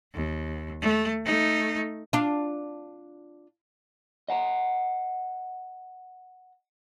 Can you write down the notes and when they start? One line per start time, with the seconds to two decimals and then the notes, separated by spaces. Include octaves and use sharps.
0.14 D#2
0.81 A3
1.25 A3 D#4
2.13 D4 F4
4.29 D#5 F#5 A#5